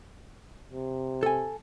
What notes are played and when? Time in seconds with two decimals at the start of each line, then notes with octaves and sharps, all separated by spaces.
0.73 C3
1.23 A4 G#5